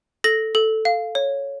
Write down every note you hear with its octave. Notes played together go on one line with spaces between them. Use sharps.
A4 A#6
A4
F5
C#5